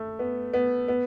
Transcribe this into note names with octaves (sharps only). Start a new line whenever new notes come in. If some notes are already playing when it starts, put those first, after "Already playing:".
Already playing: A3
B3
B3
B3